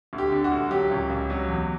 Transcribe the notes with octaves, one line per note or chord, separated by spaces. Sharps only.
D2
G4
D3
F#4
D2
F#3 G4
C#2
C#2
F#3
E2